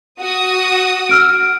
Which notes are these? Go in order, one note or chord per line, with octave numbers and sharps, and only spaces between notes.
F#4 D#6
E6 F6 D7